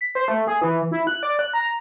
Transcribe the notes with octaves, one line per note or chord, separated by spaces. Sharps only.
B6
C5
A3
G#4
E3
E4
F#6
D5
F#6
A#5